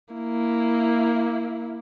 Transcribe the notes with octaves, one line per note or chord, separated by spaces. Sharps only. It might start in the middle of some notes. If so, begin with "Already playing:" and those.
A#3 E4